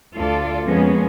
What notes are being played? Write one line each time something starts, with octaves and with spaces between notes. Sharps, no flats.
D2 F4 A4 D5
F2 G#3 A#3 B3 C#4 G#4